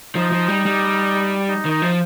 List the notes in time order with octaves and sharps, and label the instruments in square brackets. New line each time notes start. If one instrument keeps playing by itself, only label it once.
[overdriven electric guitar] F3 [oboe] D#4
[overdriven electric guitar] F3
G3
G3
[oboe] D#4
[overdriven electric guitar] D#3
[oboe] D#4
[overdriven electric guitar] F3